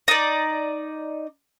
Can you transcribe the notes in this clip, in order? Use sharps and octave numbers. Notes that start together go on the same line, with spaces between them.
D#4 D5